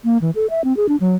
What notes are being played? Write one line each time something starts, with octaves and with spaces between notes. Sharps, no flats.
A#3
E3
A4
E5
C4
G#4
D4
F#3